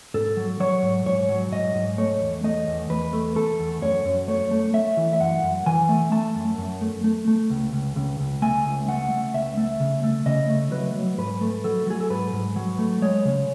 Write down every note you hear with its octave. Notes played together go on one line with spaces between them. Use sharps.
G#2 A4
F#3
F#3 C#5
G#2
G#2 C#5
F#3
G#2 D#5
G#2
A3 C#5
E2
A3 D#5
E2
E2 B4
A3
A3 A4
E2
F#2 C#5
F#2
A3 C#5
A3
A3 E5
E3
E5
F#2 F#5
F#2
E3 G#5
A3
A3 A5
F#2
F#2
A3
A3
A3
C#2
C#2
C#2
C#2
A3 G#5
C#2
A3 F#5
A3
C#2 E5
A3
C#3
A3
C#3 D#5
A3
F#3 B4
F#3
G#2 B4
A3
F#3 A4
F#3 G#4
A4
G#2 B4
G#2
F#3
A3
G#3 C#5
C#3